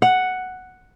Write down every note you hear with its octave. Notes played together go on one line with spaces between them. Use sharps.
F#5